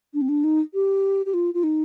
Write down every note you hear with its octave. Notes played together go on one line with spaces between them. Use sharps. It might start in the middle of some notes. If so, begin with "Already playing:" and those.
D4
C4
D4
D#4
G4
G4
F4
F4
D#4